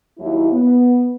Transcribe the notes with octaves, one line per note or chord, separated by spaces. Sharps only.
D#2 F#3 E4
B3